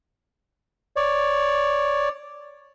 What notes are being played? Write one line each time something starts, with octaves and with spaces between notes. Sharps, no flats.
C#5 D5